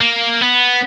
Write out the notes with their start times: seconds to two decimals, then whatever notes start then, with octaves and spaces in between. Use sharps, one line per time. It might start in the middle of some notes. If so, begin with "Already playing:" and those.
0.01 A#3
0.42 B3